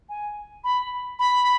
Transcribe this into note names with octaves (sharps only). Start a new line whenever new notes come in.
G#5
B5
B5